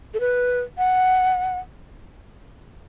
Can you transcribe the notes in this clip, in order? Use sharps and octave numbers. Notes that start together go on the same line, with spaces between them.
A4
B4
F#5